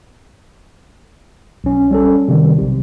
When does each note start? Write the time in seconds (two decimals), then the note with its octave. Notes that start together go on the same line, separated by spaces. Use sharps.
1.64 B1 C#4
1.91 G3 C#4 A4
2.28 C3 D#3 G3
2.58 B1 C3